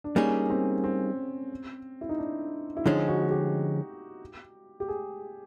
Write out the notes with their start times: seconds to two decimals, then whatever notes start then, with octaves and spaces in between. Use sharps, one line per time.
0.04 D4
0.16 G3 A#3 C#4 D#4 G#4
0.50 C4
0.84 C4
2.01 E4
2.09 D#4
2.18 D4
2.77 E4
2.86 D3 F3 G#3 C#4 D#4
3.08 F#4
3.30 G4
4.80 G4
4.88 G#4